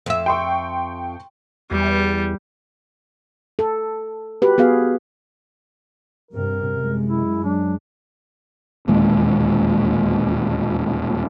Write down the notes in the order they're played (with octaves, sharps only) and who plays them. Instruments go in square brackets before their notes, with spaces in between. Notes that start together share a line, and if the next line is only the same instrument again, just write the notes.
[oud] F2 E5
[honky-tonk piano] G5 C6 C#6
[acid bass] E2 [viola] G3
[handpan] A4
F#4 G4 B4
B3 F#4 G#4 F5
[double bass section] G2 C3 G3 [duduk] A#4
[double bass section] F#2 G#3 [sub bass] C3
[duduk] E4
[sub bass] F#3 [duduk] D4
[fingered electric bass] E1 D#2 A#2 G#3